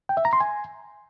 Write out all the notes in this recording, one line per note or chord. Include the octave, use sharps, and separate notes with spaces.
G5
E5
A#5
C6
G#5